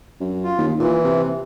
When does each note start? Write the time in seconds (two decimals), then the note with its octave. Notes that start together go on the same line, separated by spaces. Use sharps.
0.20 F#2
0.44 F4
0.58 D#2
0.80 A#2 E3
1.04 C3